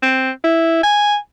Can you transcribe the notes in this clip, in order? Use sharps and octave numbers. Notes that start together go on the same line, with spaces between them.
C4
E4
G#5